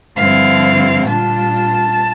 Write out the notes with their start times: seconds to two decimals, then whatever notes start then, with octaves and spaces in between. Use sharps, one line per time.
0.17 G2 D3 F3 C4 E4 F5
1.06 A#2 G3 D4 F4 A5